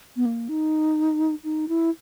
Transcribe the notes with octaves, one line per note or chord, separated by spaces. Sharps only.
B3
A#3
D#4
D#4
E4